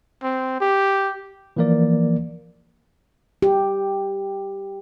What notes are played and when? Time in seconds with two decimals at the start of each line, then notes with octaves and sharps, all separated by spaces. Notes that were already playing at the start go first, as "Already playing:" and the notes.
0.23 C4
0.61 G4
1.56 E3 F3 A#3 A#4 D5
3.42 G4